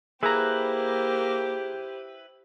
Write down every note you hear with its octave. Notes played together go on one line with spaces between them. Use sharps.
A#3 E4 G4 G#4 B4 C5 A#5